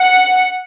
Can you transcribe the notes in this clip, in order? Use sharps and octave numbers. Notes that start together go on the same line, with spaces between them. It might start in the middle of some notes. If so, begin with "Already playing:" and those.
Already playing: F#5